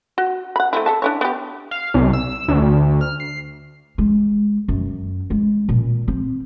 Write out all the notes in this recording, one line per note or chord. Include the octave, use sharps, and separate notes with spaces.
F#4
F#5 B5
A3 C4 E4
A4 E5 A5
D4 E4 C#5
B3 G4
F5
C2
E6
D2
F6
C7
G#3
F#2
G#3
A#2
C4